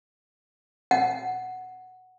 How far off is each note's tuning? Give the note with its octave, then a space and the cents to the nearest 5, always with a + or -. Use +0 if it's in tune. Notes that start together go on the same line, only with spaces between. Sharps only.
F#5 +0